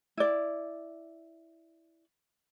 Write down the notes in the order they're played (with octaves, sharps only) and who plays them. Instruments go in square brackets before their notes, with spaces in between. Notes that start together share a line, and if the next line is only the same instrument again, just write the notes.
[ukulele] E4 D5